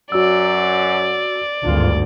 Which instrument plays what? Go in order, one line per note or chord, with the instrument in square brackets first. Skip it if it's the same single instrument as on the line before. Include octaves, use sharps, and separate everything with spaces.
[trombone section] F#2 F#3 [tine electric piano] F#4 E6 [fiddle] D5
[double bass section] G#1 D2 G2 [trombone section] D4 F4